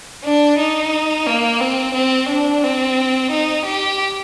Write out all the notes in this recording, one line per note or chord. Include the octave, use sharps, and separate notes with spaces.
D4
D#4
A#3
C4
C4
D4
C4
D#4
G4